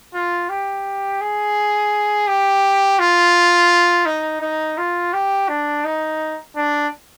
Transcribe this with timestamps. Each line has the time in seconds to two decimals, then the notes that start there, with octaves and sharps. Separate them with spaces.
0.14 F4
0.50 G4
1.21 G#4
2.28 G4
2.99 F4
4.06 D#4
4.42 D#4
4.78 F4
5.13 G4
5.49 D4
5.85 D#4
6.56 D4